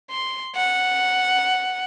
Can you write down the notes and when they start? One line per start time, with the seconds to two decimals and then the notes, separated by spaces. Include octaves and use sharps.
0.11 C6
0.56 F#5